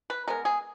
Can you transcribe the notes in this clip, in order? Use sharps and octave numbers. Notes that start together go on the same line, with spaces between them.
B4
G#3 B3 A#4
G#4